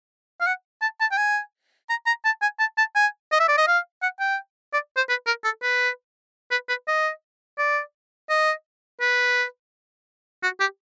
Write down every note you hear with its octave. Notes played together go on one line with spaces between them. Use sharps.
F5
F#5
A5
A5
G5
G#5
A#5
A#5
A5
G#5
A5
A5
G#5
D#5
E5
D5
D#5
F5
F#5
G5
D5
C5
B4
A#4
A4
B4
B4
B4
D#5
D5
D#5
B4
F#4
G4